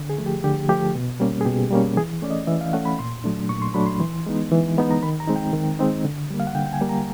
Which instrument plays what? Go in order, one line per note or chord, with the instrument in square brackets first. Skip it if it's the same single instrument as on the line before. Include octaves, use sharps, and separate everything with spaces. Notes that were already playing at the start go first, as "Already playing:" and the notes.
Already playing: [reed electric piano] D3
G#4
F3 A3
G4
D3 G4
F3 A3 G4
B2
G3 A#3 C#4
G#4
B2 G4
G3 A#3 C#4
E3 G#4
A3 C#4 D5
D#5
E3 E5
F5
A3 C#4 F#5
B5
A#2 C6
F#3 A3 D4
A#2 C#6
C6
F#3 A3 D4 B5
C6
E3
G#3 B3 D#4
E3
G#3 B3 D#4
A#5
D#3 B5
A#5
G#3 C4 D#4
G5
D#3
G#3 C4 D#4
D3
G3 A#3
F5
F#5
D3 G5
G5
G#5
G3 A#3
A#5